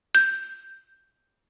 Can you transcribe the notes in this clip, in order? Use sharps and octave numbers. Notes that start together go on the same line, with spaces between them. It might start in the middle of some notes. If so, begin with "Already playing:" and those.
G6